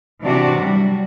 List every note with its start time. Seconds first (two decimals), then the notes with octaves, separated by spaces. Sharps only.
0.24 C3 E3 D4 F#4 D5
0.57 F#3 G3